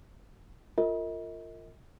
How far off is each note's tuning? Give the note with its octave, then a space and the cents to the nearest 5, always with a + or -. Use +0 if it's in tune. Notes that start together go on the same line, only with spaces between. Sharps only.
F4 +0 A#4 -35 D#5 +40